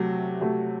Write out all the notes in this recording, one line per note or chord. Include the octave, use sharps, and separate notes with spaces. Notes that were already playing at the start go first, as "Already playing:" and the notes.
Already playing: C3 F#3 A3
C3 F#3 A3